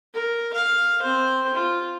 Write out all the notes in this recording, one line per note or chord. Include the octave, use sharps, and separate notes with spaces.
A#4
F5
C4 C5
F4